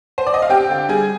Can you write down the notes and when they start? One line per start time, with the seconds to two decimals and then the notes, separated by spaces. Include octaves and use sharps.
0.18 C5
0.27 D5
0.34 D#5
0.42 F5
0.49 C4 G4 G5
0.69 D3
0.89 G3 G#4 G#5